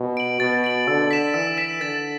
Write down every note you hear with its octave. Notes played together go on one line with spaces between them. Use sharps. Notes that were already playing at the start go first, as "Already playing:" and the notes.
Already playing: B2
D7 F#7
B2 A6
D7 F#7
D3 E6
B6 E7
E3 E6
B6 E7
D3 A6